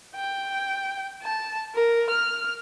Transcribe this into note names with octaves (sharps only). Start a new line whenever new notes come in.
G5
A5
A#4
F6